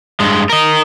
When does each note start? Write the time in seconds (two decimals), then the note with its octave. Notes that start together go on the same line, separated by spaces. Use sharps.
0.20 G2 G#3
0.49 A#4 D#5